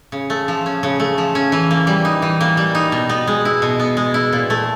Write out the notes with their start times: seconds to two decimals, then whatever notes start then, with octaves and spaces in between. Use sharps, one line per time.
0.12 C#3
0.30 A3
0.48 F3
0.66 C#4
0.83 C#3
1.00 A3
1.18 F3
1.35 C#4
1.52 E3
1.71 A#3
1.87 G3
2.05 D#4
2.22 E3
2.41 A#3
2.57 G3
2.75 D#4
2.92 B2
3.09 B3
3.27 G#3
3.45 E4
3.62 B2
3.80 B3
3.97 G#3
4.14 E4
4.33 A#2
4.50 A3